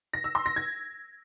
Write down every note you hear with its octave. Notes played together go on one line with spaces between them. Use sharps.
A#6
E6
C6
A#6
G#6